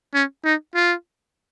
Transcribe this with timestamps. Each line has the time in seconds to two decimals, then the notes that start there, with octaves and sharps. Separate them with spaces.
0.14 C#4
0.45 D#4
0.75 F4